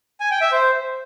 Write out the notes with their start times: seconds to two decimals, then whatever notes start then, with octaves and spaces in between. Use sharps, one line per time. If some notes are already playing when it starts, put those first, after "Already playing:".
0.20 G#5
0.31 G5
0.41 E5
0.52 C5